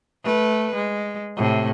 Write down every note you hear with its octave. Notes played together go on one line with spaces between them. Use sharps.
A3 B4
G#3
A2 C3